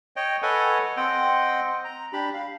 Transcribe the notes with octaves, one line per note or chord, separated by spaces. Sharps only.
C#5 D#5 G5
A4 B4 C#5 D#5 F#5 G#5
C4 D#5 F#5 G5
A#5
D4 G4 B5
F5